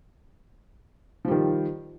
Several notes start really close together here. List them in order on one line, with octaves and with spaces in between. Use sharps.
F3 G3 D#3